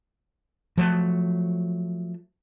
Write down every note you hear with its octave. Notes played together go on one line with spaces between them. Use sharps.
F3 F#3 A3